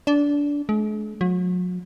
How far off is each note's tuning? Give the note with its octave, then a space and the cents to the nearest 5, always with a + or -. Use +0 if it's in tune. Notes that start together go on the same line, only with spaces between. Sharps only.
D4 -20
G#3 +45
F#3 -40